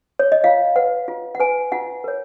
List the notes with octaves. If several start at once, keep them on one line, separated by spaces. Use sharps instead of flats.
C#5
D#5
F4 F5
B4 F#5
F4
F#5
B4 G#5
F4 F#5
A#4 C#5